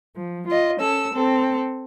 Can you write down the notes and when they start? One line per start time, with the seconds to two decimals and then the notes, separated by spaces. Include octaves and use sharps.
0.16 F3
0.46 F4 D#5
0.79 C#4 A4 E6
1.13 C4 A4